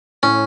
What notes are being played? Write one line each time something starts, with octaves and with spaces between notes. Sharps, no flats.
A2 C#4